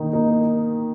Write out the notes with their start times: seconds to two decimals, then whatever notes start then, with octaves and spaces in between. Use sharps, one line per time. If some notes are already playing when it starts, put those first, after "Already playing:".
Already playing: D#3 A#3 D#4
0.13 A#3 D#4